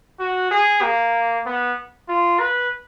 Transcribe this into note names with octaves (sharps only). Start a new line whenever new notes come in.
F#4
G#4
A#3
B3
F4
B4